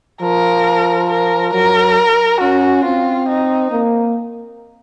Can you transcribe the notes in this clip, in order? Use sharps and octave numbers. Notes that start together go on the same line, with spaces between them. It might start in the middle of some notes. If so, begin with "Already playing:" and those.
F3 A#4
A#4
F#3 A#4
C#4 F#4
C4 F4
D#4
A#3